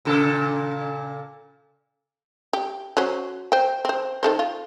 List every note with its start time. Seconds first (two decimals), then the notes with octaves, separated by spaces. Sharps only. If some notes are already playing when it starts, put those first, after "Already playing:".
0.05 A#2 C#3 A4
2.53 G4
2.97 F#3 C#4 C5
3.52 C5 G5
3.85 C4 C5
4.23 D#3 A4 C5
4.39 F4